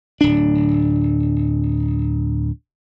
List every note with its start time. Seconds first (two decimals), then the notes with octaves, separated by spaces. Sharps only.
0.21 D1 D4